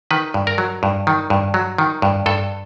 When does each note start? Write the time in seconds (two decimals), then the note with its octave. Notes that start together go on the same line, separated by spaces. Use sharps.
0.11 D#3 B4
0.34 G2
0.47 A#4
0.58 F#3
0.83 G2
1.07 D#3
1.30 G2
1.54 F#3
1.78 D#3
2.02 G2
2.26 G2 A4